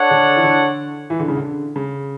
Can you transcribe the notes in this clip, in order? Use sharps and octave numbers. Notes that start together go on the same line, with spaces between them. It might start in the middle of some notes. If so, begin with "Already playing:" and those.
Already playing: D4 A4 C#5 F#5
D3
E3
D3
E3
D3
C#3
D3
C#3